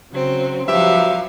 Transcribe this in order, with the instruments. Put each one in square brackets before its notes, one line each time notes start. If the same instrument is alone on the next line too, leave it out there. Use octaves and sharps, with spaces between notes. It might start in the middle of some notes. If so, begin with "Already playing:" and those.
[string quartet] C#3 F#3 C4
[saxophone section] G2 G4 E5 [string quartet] F3 F#3 F5